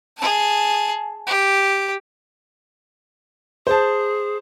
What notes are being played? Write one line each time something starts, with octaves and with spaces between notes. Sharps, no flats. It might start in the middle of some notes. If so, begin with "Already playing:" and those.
G#4 A5
G4
G#4 C5 A5